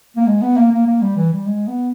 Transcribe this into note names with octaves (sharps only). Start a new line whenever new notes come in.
A#3
G#3
B3
A#3
A#3
A#3
G3
E3
G3
G#3
B3